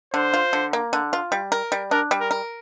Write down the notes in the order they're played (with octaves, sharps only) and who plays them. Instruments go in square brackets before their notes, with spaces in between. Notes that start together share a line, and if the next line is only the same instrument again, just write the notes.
[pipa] D3 [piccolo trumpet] C5
[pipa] F4
D3
A#3
D3
F4
G3
A#4
G3
[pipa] D4 [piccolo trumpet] A#4
[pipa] G3
[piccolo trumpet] A#4
[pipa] A#4